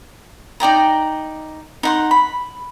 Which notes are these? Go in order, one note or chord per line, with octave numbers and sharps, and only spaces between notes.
D#4 D5 G5 A#5
D#4 F#5 C6
B5